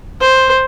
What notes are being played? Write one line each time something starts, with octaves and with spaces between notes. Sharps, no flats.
C5